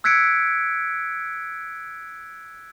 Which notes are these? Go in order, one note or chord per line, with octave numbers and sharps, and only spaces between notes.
E6 F#6 G#6 B6 C#7 D7